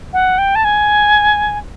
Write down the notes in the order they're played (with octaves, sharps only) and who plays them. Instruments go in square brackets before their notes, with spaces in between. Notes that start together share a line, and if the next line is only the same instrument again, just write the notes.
[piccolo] F#5
G5
A5
G#5